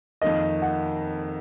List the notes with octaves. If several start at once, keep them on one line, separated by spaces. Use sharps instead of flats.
F2 D#3 A#3 D#5
F#5